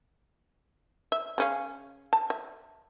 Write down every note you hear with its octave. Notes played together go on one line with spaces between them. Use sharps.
E5
C#3 C#4 F5
A5
E5